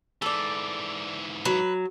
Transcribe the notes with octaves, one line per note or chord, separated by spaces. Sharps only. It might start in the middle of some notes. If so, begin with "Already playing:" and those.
G#2 E3 A4 D5
F#3 B4